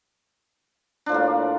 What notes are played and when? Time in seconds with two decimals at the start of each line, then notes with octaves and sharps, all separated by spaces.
1.06 D4
1.09 F3
1.12 A2
1.14 A#3